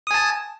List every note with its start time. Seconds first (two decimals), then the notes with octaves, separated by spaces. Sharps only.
0.07 D#6
0.11 G#5
0.14 A5